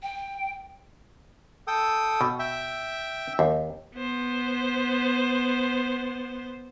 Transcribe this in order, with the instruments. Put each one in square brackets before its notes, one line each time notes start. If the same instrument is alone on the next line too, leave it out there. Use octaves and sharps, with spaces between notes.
[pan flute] G5
[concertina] A4 G5 D#6
[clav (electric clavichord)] B2
[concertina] E5 G5
[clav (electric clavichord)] D#2
[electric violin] B3 C5